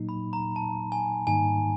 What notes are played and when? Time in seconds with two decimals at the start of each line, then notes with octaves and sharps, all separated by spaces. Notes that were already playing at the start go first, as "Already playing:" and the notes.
Already playing: A#2 F#3 A#3 D#4
0.09 B5
0.33 A#5
0.56 A5
0.92 G#5
1.27 G#2 D#3 G3 A#3 D#4 G#5